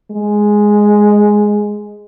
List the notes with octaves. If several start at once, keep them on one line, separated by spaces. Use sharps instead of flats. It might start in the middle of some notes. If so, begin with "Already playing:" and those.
G#3